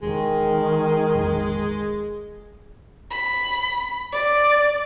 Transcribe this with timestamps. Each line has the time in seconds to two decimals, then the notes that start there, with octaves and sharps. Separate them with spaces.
0.02 E1 D#3 G#3
1.15 E1 A#1 F2
3.10 B5
4.13 D5